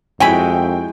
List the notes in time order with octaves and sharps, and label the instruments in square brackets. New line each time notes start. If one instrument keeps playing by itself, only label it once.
[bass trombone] F2 [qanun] G#3 E4 F#4 [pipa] C#5 G#5 B5 [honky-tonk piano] G5